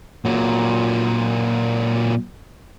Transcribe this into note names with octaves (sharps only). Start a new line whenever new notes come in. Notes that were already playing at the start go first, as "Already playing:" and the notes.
A#2 F#3